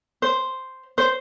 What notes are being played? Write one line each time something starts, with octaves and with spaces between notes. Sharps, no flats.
C5
C5